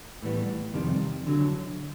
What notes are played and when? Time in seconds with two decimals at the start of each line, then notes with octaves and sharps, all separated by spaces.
0.23 A2 E3 G3 B3
0.74 F2 C3 D#3 G3
1.27 D3 F#3